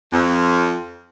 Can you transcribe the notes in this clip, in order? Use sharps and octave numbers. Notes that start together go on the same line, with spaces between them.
F2